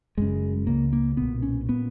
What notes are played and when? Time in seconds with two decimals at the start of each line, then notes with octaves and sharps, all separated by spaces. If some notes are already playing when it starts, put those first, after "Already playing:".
0.18 F#1 F#2 C#3 G#3
0.67 C#2 C#3 A#3
0.93 A#3
1.17 B1 A#2 B3
1.42 C#4
1.69 A#2 B3